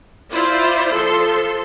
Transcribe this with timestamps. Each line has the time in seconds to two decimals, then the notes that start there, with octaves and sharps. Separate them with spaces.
0.31 E4 F4 C5 D5
0.92 F3 A4 C6